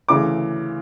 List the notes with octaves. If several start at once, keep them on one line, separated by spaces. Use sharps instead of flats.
D2 C#3 E3 D6